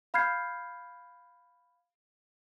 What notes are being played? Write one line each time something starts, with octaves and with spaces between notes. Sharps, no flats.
F5 B5 F6 G6 G#6 C7